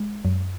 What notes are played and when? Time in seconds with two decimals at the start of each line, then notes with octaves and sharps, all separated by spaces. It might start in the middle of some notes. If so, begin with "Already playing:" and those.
Already playing: G#3
0.25 F#2